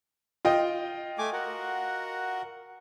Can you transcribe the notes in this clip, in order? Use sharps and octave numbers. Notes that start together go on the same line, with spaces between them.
F4 D#5 G5
A3 G#5 D6
F#4 A#4 F#5